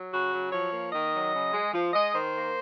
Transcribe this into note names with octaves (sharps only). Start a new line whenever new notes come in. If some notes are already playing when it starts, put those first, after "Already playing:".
Already playing: F#3
C#3 F#4
F#3
F3 C#5
A#3
D#3 D#5
F#3
C#3
G#3
F3
G#3 D#5
D#3 C5
A#3